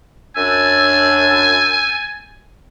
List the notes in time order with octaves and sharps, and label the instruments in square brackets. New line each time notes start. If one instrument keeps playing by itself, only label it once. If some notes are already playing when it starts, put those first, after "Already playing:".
[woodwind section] F#2 D4 E6 [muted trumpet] G#5